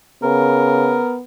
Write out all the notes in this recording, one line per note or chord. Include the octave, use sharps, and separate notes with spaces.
C#3 B3 A#4